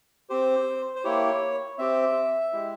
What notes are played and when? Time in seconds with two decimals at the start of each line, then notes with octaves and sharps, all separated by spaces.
0.30 C4 G4 C5
0.96 C5
1.04 A#3 E4 G4 C#5
1.79 C4 G4 E5
2.53 G#3 E4 G4